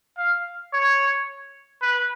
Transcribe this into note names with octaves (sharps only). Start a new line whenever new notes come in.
F5
C#5
B4